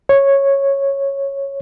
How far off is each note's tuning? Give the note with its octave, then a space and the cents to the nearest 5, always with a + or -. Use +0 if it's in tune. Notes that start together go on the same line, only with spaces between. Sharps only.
C#5 -10